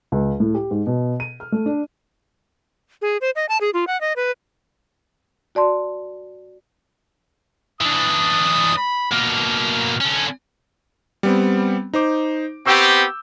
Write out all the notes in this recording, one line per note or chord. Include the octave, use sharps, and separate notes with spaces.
C#2
A2
G4
G#2
B2
D#7
F6
A3
D4
G#4
C5
D#5
A5
G#4
F4
F#5
D#5
B4
F#4 D5 A5 C6
E3 D4 D#6
B5
B2 A#3 F6
D3 C#4
G3 B3 C4
D#4 C5 D6
B3 C4 G4 C#6 E6 G6